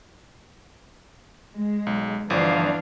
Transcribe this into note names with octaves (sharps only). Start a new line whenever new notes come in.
G#3
B1
G1 E3 F3 D4 F5